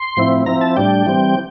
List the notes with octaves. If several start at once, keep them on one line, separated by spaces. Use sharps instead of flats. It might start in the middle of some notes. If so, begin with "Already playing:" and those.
Already playing: C6
A2 F3 C4 E4
F3 C4 E4 A#5
A5
A2 G3 D4 G5
E3 G3 C4